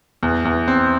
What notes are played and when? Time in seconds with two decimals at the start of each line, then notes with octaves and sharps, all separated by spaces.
0.23 E2
0.45 E2
0.68 C4